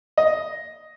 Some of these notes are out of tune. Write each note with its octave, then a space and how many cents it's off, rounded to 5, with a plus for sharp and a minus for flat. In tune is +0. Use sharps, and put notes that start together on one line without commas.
D#5 +5